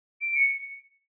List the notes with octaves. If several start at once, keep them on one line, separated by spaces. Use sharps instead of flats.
D7
C#7